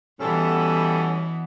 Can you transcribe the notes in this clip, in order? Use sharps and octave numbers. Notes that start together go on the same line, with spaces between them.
B2 E3 G3 B3 C#4 A4